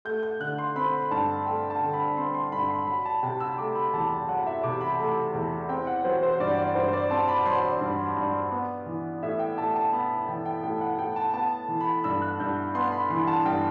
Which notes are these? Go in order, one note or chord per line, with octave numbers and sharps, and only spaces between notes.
A3 G6
G6
D3 F#6
C6
C4 B5
G2 A5
A3 G5
A5
D3
B5
C4 C6
C6
G2 B5
C6
F#3 B5
A5
C3 G5
E6
A3 D6
B5
E2 A5
F#3 F#5
E5
C3 D6
B5
A3
E2
C4 G5
F#5
F#3 C5
C5
G2 D5
D5
G2 C5
C5
D5
C4 A5
B5
F#3 C6
D5
G2
G2
B3
E3
A2 E5
G5
A2 A5
A5
B3 B5
E3 G5
G5
A2 G5
F#5
A2 G5
A5
B3 A5
E3
B5
G2 E6
F#6
G2 G6
B3 C6
B5
E3 C6
A5
G2 G5